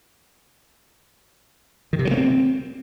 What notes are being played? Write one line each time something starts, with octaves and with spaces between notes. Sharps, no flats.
D#3
C3
F#3
A#3
C4